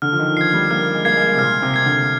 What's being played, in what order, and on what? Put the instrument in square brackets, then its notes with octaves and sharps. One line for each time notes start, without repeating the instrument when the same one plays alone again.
[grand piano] D3 [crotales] F6
[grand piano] F3
D#3
[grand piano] F3 [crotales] G#6 C7
[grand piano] G3
[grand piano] A#3 [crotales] F6
[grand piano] G#3
[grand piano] A#3 [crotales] G#6 C7
[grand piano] G#3
C3
[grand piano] A#2 [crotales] F6
[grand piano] C3
[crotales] G#6 C7
[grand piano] D3